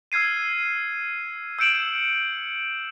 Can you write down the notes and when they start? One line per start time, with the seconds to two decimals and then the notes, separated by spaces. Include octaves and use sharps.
0.12 E6 F6 G#6 C7 D#7
1.59 E6 G6 C#7 D7 E7 F#7